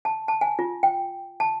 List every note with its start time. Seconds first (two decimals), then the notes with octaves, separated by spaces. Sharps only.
0.05 A5
0.28 A5
0.41 G#5
0.59 F4
0.83 G5
1.40 A5